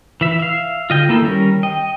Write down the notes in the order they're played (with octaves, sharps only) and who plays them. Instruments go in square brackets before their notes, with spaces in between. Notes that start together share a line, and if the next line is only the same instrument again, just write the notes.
[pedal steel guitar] E3 E5
E5 F5
[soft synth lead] D3 [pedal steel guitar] F4 D#5 G5
[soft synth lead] D#3 [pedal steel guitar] A#3 E4 A4
[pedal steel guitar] G3 C#4 A#4
[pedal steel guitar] D#5 [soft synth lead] G5